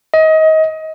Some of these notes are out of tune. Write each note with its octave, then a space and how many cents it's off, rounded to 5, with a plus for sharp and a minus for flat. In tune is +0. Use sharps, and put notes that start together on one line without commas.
D#5 +25